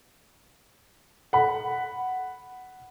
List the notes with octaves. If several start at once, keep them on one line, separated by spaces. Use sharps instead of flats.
F#5 B5